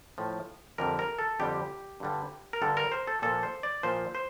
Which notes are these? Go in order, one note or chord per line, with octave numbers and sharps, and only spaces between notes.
A2 F3
F2 D3 G3 A#4
A#4
A4
F2 D3 G3 G4
G2 D3 G3
A#4
G2 D3 G3 A4
A#4
C5
A4
A#2 F3 A4
C5
D5
A#2 F3 C5
C5